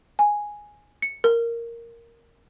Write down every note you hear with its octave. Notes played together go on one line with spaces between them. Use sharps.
G#5
C#7
A#4